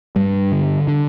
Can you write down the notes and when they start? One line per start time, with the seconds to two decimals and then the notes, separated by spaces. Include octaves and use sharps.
0.16 G2 G3
0.52 D3
0.88 D3